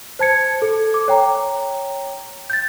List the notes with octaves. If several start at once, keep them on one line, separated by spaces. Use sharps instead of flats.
C5 A5 G#6 C#7
A4
D6
C#5 G5 A#5
G6 A6